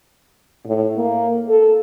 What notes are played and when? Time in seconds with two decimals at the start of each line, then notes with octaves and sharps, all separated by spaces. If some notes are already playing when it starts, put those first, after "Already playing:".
0.67 A2
0.97 A#3
1.49 A4